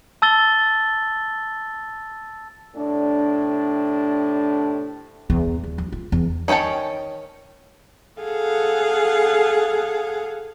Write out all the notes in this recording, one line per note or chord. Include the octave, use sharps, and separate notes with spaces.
A5 E6 A6 G7
A2 C3 D4
E2
D#2
F#3
F4
E2
D#3 C#4 C#5 G5 A5
G#4 A4 F5 F#5